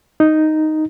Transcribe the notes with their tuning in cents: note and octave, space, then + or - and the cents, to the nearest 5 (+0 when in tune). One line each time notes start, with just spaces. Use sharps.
D#4 +0